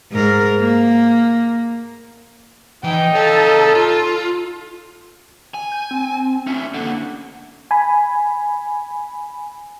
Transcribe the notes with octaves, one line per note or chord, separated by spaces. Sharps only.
G#2 A#4
A#3
E3 D#4 G5
A4 C#5 F5
F4
G#5
G6
C4
C#4 E4 E5
D3 A#3 F#5
G#5 B5